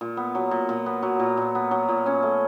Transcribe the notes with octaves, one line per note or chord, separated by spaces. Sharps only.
A#2
B3
F#3
A#2
A#2
B3
F#3
A#2
A#2
B3
F#3
A#2
C#4
A3